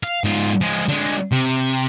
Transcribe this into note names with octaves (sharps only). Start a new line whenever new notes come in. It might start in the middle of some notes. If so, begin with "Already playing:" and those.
F5
G#2 F4
F3 G#3
D3 G#3
C3